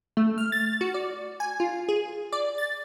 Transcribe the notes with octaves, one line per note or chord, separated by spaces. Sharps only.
A3
F6
A6
F#4
D5
G#5
F4
G#4
D5
A6